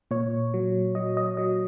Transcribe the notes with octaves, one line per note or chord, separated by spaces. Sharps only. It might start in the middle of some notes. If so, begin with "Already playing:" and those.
A#2 C#5
F#3
F#3 D#5
D#5
F#3 D#5